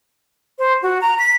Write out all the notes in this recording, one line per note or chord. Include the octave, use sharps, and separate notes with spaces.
C5
F#4
A#5
B6